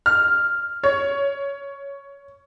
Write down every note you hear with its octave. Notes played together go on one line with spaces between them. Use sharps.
F6
C#5